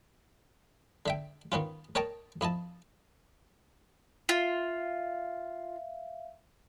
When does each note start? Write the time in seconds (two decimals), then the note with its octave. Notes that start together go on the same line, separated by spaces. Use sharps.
1.06 D3 E5 G5
1.52 D#3 B3 C#4 F4
1.95 A#4 C#5 D#5 G5 A5 A#5
2.41 F2 E4 D#5 A5
4.29 F4 E5 F5